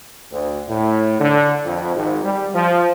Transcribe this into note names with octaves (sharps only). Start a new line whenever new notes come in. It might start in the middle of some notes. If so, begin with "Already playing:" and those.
D2
A2
D3
F2
G#1
G3
F3